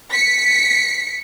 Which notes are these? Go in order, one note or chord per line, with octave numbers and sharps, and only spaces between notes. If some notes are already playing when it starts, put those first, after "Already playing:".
B6 C#7